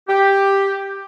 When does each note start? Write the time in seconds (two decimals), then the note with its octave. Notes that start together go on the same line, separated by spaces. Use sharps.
0.09 G4